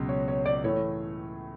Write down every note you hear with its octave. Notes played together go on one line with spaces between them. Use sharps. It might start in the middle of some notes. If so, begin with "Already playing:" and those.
Already playing: C#2 B2 F#3
C#5
C#5
D5
A2 E3 A3 C#5